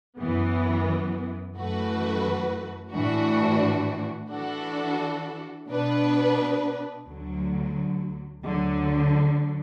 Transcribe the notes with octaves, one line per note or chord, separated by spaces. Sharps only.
F#2 E3 B3
F#2 E3 A3 F#4 B4
A2 E3 D4 F#4
E3 D4 F#4 A4
B2 B3 D4 B4
D2 D3 F#3
D2 D3 F#3